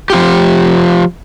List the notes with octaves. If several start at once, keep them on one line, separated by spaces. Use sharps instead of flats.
F3 F4 G4